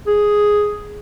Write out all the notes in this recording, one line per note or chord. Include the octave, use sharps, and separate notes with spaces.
G#4